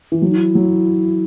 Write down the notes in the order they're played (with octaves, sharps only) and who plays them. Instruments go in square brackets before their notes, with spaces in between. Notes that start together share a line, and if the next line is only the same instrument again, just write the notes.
[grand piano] E3
[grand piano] F#3 [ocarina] E4
[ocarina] D#4
E4
[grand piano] F#3